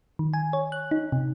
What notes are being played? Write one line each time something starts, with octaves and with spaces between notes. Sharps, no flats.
D#3
G#5
C#5
F#6
D#4
C3